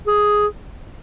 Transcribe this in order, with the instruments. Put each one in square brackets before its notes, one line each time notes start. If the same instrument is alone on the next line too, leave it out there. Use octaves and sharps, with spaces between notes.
[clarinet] G#4